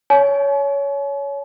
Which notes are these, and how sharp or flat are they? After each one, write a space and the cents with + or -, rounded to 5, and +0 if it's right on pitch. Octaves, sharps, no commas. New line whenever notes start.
C#5 +15 G#5 +45